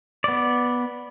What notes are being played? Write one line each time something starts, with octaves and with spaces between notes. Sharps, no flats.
B3 D5